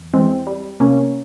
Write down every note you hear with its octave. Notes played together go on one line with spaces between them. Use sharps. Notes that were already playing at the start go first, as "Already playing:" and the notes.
Already playing: E2
E3 G#3 C4
G3
C3 A#3 C#4